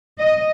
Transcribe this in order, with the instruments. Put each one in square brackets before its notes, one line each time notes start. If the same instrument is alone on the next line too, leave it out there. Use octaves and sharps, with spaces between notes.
[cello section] D#5